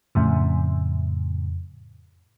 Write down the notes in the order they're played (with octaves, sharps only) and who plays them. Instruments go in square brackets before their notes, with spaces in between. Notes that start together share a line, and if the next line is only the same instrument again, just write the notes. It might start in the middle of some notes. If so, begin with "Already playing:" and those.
[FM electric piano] F2 A2 C#3